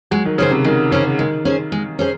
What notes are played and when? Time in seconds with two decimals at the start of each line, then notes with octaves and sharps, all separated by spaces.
0.11 F#3 G#3
0.25 D#3
0.38 C#3 C#4 G#4 C5
0.51 C3
0.64 D#3 G#3
0.91 C#3 C#4 G#4 C5
1.19 D#3 G#3
1.45 C#4 G#4 C5
1.72 G#3
1.99 C#4 G#4 C5